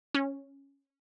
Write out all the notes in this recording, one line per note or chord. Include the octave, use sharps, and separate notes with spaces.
C#4